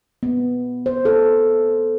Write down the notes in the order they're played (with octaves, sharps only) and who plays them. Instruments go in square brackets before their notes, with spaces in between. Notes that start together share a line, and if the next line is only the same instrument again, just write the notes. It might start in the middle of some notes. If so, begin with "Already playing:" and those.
[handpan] B3
C5
A4